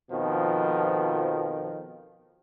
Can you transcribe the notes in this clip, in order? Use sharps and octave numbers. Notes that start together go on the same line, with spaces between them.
F2 B2 D#3 F3